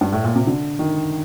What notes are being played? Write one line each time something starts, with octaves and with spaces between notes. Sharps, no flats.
G2
A2
A#2
C3
D3
D#3